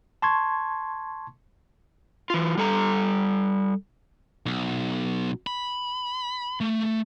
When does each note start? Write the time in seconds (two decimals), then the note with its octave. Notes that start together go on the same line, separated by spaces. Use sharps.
0.22 A5 C6 C#6 G#6
2.30 E3 F4
2.57 G3 A4 A5 A#5
4.46 B1
5.47 B5
6.61 A3